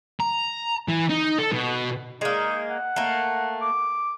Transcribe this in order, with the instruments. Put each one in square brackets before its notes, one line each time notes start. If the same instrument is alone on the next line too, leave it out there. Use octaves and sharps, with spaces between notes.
[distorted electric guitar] A#5
E3
D#4
A4
B2
[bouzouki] G#3 A#3 [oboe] D#4
[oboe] F#5
[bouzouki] A3 A#3
[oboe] D6